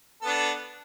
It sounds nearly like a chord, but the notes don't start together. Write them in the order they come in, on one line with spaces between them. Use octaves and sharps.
A4 B3 D4